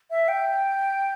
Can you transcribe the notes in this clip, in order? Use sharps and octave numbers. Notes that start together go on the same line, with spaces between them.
E5
G5